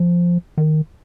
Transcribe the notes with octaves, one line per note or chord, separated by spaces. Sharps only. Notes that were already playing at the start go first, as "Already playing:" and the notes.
Already playing: F3
D#3